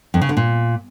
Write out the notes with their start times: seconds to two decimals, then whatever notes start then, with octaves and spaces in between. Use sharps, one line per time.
0.14 F2
0.21 C#3
0.29 D3
0.37 A#2